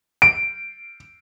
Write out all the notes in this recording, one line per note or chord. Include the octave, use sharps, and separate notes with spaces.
D7